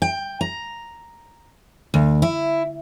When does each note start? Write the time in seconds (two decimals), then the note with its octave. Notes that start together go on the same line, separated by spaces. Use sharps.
0.02 G5
0.41 A#5
1.94 D2
2.22 E4